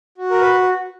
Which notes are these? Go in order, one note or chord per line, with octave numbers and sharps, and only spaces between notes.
F#4
A#4
B4